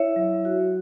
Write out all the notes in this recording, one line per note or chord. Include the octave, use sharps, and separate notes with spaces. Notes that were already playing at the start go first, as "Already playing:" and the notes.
Already playing: E4 C#5 E5
F#3
F#4